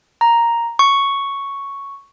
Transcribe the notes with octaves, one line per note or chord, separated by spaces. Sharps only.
A#5
C#6